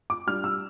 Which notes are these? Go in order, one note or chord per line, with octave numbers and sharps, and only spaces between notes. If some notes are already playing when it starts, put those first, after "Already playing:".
D6
G3 D4 F4 F6
E6